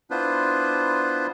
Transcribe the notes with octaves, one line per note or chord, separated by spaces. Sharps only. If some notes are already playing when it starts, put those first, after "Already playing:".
B3 D4 E4 F4 B4 C5